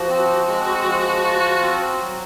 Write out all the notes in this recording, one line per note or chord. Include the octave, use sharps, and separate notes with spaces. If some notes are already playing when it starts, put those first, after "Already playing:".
Already playing: F3 F#4
C4
G#3 F#4
F3
F4
C4
F#3